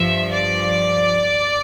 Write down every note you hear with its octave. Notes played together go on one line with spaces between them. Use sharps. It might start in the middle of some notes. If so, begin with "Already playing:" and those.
Already playing: G2 F3 E5
D5